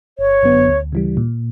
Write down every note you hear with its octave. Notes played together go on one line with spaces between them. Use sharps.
G1 C#5
F#2 D3 F#3 B3
D2
C#3 E3 G3
A#2